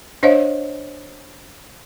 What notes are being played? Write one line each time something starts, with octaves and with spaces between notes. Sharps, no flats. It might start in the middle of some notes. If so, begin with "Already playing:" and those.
D4 C5 C#5 D#5 F5